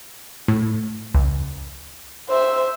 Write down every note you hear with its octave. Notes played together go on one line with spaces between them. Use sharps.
A2
C#2
C5 E5